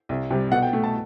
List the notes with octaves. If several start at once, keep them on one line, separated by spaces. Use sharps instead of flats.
C2
C3 G3
B2 F#5
G5
A3
A5